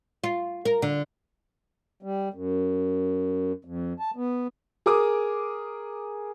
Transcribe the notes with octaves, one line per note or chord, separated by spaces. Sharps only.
F4
A#4
D3
G3
F#2
F2
A5
B3
G#4 A#4 D6 D#6